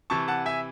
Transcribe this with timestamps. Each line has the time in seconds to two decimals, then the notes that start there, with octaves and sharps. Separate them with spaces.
0.10 C3 E3 A5 C#6
0.28 F#5 A5
0.46 E5 G#5